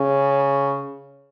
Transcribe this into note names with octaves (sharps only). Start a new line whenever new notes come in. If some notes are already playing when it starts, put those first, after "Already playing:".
Already playing: C#3